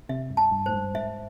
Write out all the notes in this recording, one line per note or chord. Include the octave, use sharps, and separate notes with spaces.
C3 E5
G2
A5
G2
G#2 C5
G2
G#2 E5